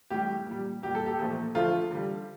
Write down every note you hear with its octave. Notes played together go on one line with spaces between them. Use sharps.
A2 G3 G4
A#2 G3
A#2 G3 G4
A4
G4
A#2 F3 A3
D3 F3 A3 F4
D3 G3